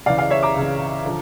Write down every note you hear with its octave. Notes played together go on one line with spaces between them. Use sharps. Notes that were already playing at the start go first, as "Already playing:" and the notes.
C#2 C#3 E3 D5 F5
D5 F5
C#5 E5
A#5 D6
C#2 C#3 E3
D3 F3